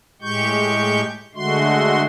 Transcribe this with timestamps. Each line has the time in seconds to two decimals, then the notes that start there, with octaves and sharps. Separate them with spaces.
0.22 A2 G#3 G4 C#6 G6
1.35 D3 G#3 A3 F#4 C6